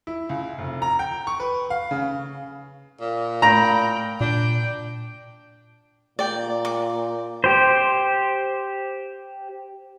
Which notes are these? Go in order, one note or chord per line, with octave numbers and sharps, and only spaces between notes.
E4
C#2
F1
A#5
G5
C#6
B4
F5
C#3
A#2
A2 G5 A#5 B5
A#2 D4 G5
A#2 D5 G5
D6
G4 C5